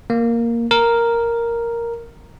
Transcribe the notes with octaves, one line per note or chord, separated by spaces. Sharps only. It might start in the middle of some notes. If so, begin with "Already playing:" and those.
A#3
A#4